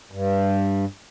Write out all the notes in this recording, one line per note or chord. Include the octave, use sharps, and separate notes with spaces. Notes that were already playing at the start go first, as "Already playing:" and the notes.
G2